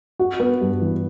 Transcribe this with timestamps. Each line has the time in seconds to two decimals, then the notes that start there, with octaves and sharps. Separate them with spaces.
0.19 F#4
0.40 B3
0.61 G2
0.81 E3